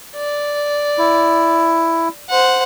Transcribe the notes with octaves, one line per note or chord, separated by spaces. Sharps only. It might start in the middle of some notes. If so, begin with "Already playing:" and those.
D5
E4
C5 F#5